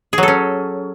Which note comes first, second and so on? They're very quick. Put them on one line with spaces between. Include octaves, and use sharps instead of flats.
G#4 F#3 A4 C#4